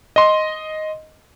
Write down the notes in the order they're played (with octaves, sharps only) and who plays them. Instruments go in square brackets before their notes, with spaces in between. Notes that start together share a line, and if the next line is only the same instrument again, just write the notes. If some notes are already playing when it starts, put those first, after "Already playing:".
[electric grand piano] D#5 C6